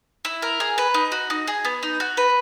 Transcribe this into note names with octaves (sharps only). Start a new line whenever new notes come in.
E4
A#4
G#4
B4
D#4
F#4
D#4
G#4
B3
D#4
F#4
B4